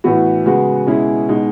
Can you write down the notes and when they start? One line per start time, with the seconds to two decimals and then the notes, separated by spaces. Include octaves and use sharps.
0.04 A2 E3 B3 F#4
0.45 C#3 G#3 B3 F#4
0.87 B2 G#3 C#4 E4 G#4
1.29 B2 G#3 D#4